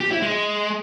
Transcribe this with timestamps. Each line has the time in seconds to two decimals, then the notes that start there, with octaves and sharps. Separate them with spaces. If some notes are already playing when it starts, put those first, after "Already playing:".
0.01 G4
0.11 E4
0.22 G#3